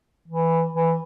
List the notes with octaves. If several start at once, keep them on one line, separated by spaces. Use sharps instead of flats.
E3
E3